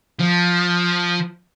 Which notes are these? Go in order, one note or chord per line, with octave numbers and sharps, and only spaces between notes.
F3